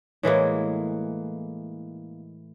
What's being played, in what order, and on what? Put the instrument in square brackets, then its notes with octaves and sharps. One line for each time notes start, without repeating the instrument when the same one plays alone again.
[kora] A2 E3 G#3 A#3